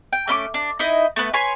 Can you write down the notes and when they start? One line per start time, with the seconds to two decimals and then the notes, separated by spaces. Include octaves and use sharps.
0.13 G5
0.28 A3 C#4 C6 D6
0.54 D4
0.79 D#4 E4 D#5
1.16 A3 B3 B4
1.33 B4 C#5 G#5 C6